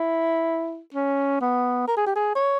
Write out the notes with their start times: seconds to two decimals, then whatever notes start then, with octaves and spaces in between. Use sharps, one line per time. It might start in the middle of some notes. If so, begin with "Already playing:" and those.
Already playing: E4
0.94 C#4
1.41 B3
1.88 A#4
1.97 G#4
2.06 G4
2.16 G#4
2.35 C#5